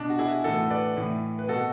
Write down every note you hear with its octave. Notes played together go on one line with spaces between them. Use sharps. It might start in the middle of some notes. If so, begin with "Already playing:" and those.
Already playing: B2 D4
F#4
E4 G#4
A2 E3 F#4 A4
B4 D5
A2 E3
B4
B2 F#4 A4